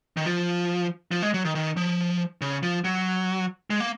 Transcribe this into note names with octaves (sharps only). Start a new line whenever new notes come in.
D#3
F3
F3
G#3
F#3
D#3
D#3
F3
C#3
F3
F#3
G#3
A#3